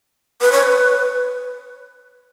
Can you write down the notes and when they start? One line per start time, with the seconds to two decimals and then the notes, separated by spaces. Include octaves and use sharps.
0.41 B4
0.52 C#5
0.63 B4